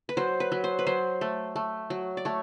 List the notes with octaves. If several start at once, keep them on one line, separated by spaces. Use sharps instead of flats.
B4
F#3 C5
B4
F#3
C5
B4
F#3 C5
A3
A3
F#3
D5
A3 C#5